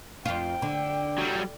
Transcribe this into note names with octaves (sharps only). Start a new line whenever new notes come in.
F2 F4 G5
D3
F#3 G3